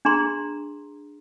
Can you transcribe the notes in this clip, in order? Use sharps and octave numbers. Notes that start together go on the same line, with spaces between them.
D4 G#4 A#5 C6